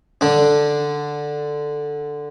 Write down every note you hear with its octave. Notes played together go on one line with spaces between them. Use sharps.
D3 D4